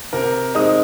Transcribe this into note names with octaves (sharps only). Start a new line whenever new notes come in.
C3 A#4 A#5
G#3 C4 D#4 D#5 D#6